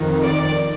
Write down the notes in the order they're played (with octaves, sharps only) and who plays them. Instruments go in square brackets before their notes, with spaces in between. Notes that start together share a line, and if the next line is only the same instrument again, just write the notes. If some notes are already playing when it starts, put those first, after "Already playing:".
Already playing: [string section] F2 D#3
D5